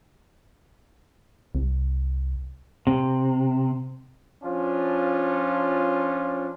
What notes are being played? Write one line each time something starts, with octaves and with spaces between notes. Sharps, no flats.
C2
C3
F3 C#4 D4 F4